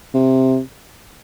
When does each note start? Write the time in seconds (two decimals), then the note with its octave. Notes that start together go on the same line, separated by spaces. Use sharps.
0.14 C3